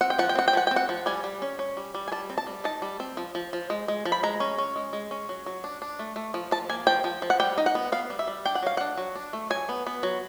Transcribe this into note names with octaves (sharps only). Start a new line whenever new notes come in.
C4 F#5
G5
F3 F#5
G5
C4 F#5
G5
F3 F#5
G5
C4
F#5
F3
G3 G#5
G3
C#4
C#4
G3
G3
G#5
G3 A5
C4
A5
G3
D#4 A5
G3
C4
F3
F3
F3
G#3
G#3
F3
B5
G#3 A#5
C#4
C#4
G#3
G#3
C#4
F#3
F#3
D4
D4
A3
A3
F3
F3 A5
A#3 G#5
F3 G5
F3
F3
F#5
G3 G5
D#4
F#5
B3
B3 F5
G3
E5
G3
D4 G5
F#5
F#3 F5
D4 F#5
F#3
D4
A3
F#3 G#5
B3
B3
F#3